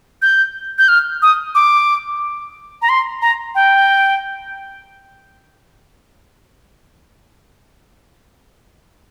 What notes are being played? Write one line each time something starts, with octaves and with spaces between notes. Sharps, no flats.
G6
G6
F6
D#6
D6
A#5
C6
A#5
G5